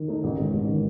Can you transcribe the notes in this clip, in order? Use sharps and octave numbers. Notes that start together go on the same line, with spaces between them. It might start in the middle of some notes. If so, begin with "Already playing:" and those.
Already playing: D#3
A3 D#4
A1
G#2 D#3
A1
D#3